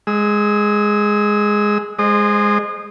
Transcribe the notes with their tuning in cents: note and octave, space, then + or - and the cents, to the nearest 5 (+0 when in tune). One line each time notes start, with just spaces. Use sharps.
G#3 +0 E6 -35
G#3 -5 C5 +0 D#5 -30